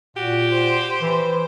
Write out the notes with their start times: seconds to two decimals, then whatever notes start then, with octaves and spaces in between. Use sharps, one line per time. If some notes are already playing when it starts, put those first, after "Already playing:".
0.17 A#2 F#4 G4
0.52 C5
1.02 E3